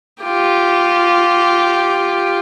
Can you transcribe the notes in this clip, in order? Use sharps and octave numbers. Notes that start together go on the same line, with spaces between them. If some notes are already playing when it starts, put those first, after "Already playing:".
F4 G4